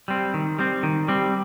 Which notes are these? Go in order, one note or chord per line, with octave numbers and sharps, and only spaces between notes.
G3 C4
D#3
G3 C4
D#3
G3 C4